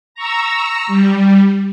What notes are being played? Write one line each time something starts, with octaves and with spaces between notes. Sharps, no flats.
A#5 C#6 E6
G3